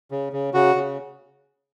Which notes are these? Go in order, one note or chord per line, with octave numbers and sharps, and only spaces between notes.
C#3
C#3
C#3 F#4
C#3